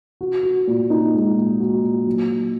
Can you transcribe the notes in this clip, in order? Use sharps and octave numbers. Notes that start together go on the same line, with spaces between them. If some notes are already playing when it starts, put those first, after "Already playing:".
F#4
F#4
A#2
D#4
G#3
A#2
F#4
A#2
F#3
F#3